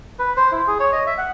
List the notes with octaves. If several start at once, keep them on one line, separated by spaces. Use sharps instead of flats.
B4
C5
E4
G#4
C#5
D#5
E5
F#5